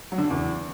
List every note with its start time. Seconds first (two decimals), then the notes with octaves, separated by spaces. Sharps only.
0.12 F#3
0.18 D3
0.24 C#3
0.31 E2